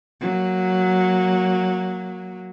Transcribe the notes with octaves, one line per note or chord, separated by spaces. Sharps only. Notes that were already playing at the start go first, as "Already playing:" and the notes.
F#3 A#3